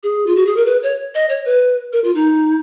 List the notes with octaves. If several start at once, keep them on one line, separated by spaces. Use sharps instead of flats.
G#4
F4
F#4
G#4
A#4
B4
C#5
D#5
C#5
B4
A#4
F4
D#4